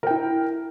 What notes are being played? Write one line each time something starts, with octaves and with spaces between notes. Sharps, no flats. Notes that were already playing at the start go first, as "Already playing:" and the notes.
E4 A#4 G5